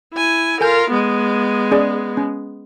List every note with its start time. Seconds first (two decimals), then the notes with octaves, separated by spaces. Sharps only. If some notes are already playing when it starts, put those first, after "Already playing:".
0.14 E4 G#5
0.61 F4 A4 A#4 G#5 G6
0.90 G#3 B3
1.71 C#4 G#4 D5
2.17 C#4